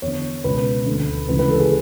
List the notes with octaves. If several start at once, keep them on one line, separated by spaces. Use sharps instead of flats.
E2 D3 C#5
C#2 B2 B4
D2 D3
C#2 C#3 E3 B4
B4
A4
G#4